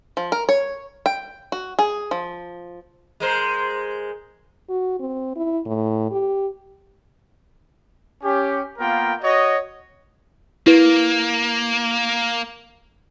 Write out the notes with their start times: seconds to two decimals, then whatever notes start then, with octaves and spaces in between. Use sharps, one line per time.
0.17 F3
0.32 A#4
0.49 C#5
1.06 G5
1.52 F#4
1.79 G#4
2.11 F3
3.20 G#3 A#4 C5
4.69 F#4
5.00 C4
5.36 E4
5.66 A2
6.11 G4
8.24 C#4 G4
8.79 A#3 B3 F4 A#4 G5
9.22 F#4 C#5 D#5
10.67 A#3 E4 B4